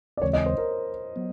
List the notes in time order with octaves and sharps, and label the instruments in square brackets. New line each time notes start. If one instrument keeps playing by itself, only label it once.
[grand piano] D5
[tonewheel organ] D#2 C#3 E3 G#3 C4 [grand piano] C#5
[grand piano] D#5
C5
A#4
[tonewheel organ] F#3 B3